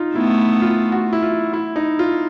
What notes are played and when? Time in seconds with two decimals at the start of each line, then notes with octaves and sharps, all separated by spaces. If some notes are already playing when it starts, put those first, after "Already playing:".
Already playing: D#4 F4
0.15 A3 B3 E4
0.62 F4
0.92 F#4
1.13 E4
1.22 F4
1.53 E4
1.76 D#4
1.99 F4